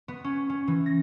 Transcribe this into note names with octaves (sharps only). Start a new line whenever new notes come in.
B3
C#4
C#4
E3
A#6